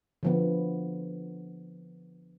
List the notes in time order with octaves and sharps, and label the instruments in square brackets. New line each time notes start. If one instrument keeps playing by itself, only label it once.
[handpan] D3 F3 B3